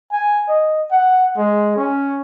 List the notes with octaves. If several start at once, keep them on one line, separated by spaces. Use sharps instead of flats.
G#5
D#5
F#5
G#3
C#4